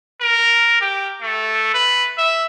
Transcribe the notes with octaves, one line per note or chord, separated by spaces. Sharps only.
A#4
G4
A3
B4
E5